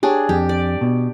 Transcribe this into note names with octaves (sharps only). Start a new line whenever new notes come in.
D4 G4 G#4 C#5
F2 G4
D5
B2